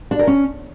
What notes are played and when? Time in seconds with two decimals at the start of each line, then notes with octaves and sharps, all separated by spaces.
0.11 D4
0.19 A#4
0.27 C#4